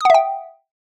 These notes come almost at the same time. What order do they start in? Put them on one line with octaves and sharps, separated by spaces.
D#6 F#5 E5 G5